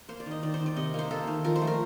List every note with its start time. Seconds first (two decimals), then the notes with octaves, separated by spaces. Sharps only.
0.09 A#3 C5
0.20 D5
0.26 D#3
0.31 D#5
0.43 D#3 D5
0.54 C5
0.60 D#3
0.66 D5
0.76 C3 D#5
0.94 A#3 C5
1.11 A#3 A4
1.27 D#3
1.44 F3 A#4
1.56 C5
1.61 A3
1.67 A#4